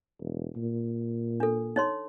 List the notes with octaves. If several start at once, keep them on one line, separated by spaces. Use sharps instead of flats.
E1
A#2
D4 A4
D#4 C#5 C6